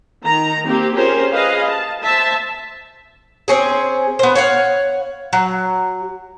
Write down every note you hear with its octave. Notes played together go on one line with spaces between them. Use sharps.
D#3 A#5
A#3 C4 G4
C#4 F4 G4 G#4 A#4 C5
G#4 B4 D#5 F5
A5
C5 E5 A5
C4 C#4 G#4
B3 C5
C#5 F5 F#5
F#3